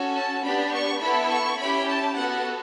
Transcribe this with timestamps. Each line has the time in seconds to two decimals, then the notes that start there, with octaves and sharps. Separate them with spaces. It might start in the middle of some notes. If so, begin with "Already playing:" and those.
Already playing: C#4 F#4 A4
0.15 A5
0.44 B3 D4 G4 B5
0.73 C#6
1.00 B3 E4 A4 B5
1.29 C#6
1.58 C#4 E4 G4 B5
1.87 A5
2.15 B3 F#4 A4 F#5